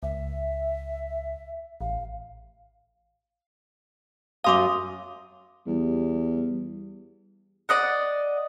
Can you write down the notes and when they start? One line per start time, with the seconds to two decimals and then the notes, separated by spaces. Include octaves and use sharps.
0.03 C#2 E5
1.81 A1 F5
4.44 F#2 F5 C6 D6 D#6
5.67 E2 G3
7.69 D5 D#5 F#5